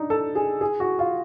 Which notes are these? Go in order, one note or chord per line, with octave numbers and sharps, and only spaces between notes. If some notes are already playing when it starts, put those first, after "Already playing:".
Already playing: D4 D#4
A4
G#4
G#4
F#4
F4